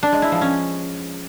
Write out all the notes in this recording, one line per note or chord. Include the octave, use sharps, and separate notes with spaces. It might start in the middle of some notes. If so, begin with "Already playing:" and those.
D4
G#3
E4
F3
C#4